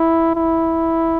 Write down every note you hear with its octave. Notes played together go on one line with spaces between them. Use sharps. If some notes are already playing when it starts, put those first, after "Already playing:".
Already playing: E4
E4